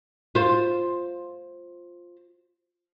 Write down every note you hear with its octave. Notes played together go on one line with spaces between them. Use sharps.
F4 C5